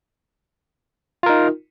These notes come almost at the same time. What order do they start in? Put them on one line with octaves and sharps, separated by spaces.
F4 A#4 D#4